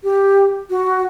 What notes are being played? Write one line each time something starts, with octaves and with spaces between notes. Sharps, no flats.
G4
F#4